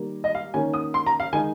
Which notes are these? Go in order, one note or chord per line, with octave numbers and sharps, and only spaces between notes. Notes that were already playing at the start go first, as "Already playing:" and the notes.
Already playing: D#3 G3 A#3
D#5
F5
D#3 A#3 C#4 G#5
D#6
C6
A#5
F5
D#3 G#3 D#4 G#5